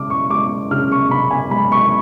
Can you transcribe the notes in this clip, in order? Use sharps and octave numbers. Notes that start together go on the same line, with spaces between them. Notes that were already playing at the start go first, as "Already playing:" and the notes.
Already playing: C#3 G#3 D6 F6
C#6
G#3 D6
C#3 F6
C#6
C#3 B5
G#5
G#3 B5
C#6